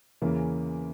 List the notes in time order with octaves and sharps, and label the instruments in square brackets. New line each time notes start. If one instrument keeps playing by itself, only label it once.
[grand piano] E2 C#3 E3 A#3